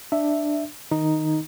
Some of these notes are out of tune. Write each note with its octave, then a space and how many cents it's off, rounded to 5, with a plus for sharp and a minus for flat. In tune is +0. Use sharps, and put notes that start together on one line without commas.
D4 +10 E5 +0
D#3 +0 D#4 +0